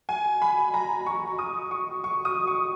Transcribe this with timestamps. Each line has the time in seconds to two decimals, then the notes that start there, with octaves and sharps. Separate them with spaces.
0.09 G#5
0.42 B5
0.74 A#5
1.06 C#6
1.39 D#6
1.71 C#6
2.04 C#6
2.25 D#6
2.47 C#6